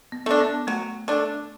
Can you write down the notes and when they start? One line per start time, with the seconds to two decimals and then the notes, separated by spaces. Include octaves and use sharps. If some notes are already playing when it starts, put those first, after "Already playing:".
0.12 B3
0.26 A3 D4
0.40 B3
0.67 F#3 A3
1.08 A3 D4